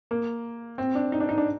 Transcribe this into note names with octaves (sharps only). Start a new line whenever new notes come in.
A#3
C4
D4
D#4
D4
D#4
D4